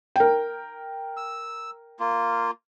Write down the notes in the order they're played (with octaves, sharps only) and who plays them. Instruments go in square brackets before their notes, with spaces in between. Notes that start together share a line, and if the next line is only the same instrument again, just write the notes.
[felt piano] A#4 G5
[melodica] E6
A#3 F4